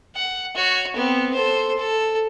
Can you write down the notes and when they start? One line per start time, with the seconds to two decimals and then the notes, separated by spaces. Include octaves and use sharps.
0.16 F#5
0.55 F#4 C#5
0.96 B3 C4
1.34 A4 C5
1.77 A4